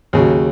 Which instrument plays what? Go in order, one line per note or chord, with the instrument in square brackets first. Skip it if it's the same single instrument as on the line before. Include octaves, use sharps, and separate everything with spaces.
[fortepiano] D#2 C#3 F#3